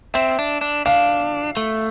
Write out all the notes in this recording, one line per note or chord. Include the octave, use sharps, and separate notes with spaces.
C4 E5
D4
D4
D4 F5
A3